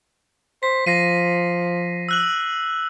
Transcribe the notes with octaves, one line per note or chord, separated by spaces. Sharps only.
C5 B6
F3 A#6 C7 D#7
E6 F#6 F#7